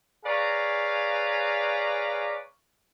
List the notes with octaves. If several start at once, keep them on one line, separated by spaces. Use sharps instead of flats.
G#4 B4 C#5 D5 F5 A#5